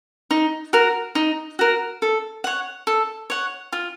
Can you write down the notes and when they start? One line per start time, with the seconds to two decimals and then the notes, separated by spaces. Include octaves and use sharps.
0.31 D#4
0.73 F#4 A#4
1.15 D#4
1.59 F#4 A#4
2.02 A4
2.44 C#5 F#5
2.87 A4
3.30 C#5 F#5
3.72 F4